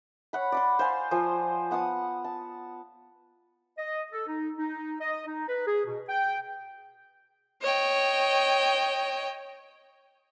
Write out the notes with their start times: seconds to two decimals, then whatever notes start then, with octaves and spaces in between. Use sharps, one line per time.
0.33 C#5 F#5 B5
0.52 D5 B5 C6
0.79 C5 F5 G#5 C6
1.11 F3 C5 G#5
1.71 B3 F#5 A5 D#6
2.24 A5
3.78 D#5
4.12 A4
4.27 D#4
4.58 D#4
5.01 D#5
5.27 D#4
5.48 B4
5.66 G#4
5.85 B2
6.09 G5
7.63 C#5 D#5 G5